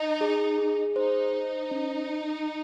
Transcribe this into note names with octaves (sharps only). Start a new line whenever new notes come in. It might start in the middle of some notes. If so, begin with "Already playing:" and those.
Already playing: D#4 D#5
G#4
G#4
D#4 C5
C5
C#4